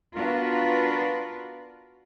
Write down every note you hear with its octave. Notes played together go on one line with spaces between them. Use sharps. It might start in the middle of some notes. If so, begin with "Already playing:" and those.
B3 D4 F4 F#4 A#4 B4